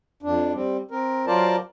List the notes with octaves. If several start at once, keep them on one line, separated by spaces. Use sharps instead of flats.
F2 D4
G3 C4
C4 A#4
F#3 F4 A#4 C5 D5 A5